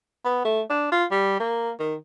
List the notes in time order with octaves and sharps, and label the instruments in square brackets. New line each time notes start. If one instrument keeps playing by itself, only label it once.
[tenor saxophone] B3
A3
D4
F4
G3
A#3
D#3